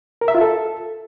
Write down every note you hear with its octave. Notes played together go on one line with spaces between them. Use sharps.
A#4
E5
F4
A4